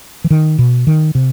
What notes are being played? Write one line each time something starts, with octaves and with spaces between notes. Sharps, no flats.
E3
D#3
B2
D#3
C3